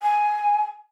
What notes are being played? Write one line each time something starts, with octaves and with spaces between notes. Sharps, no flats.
G#5